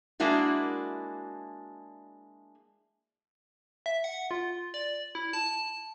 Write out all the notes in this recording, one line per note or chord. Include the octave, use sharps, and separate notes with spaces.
G#3 A#3 D4 E4 F#4
E5
F#5
F4
D5
E4
A5